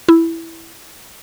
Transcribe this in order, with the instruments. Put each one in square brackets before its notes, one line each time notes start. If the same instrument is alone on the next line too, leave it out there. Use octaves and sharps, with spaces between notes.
[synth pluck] E4